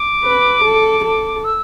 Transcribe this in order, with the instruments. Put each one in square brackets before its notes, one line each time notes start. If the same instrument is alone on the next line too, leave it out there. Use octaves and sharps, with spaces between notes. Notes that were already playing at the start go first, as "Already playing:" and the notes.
Already playing: [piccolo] D6
[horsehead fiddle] B4
A4
A4
[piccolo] E6